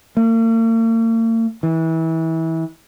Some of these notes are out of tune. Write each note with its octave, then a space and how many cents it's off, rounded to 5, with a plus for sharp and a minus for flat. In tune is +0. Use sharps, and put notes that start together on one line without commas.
A#3 -45
E3 -25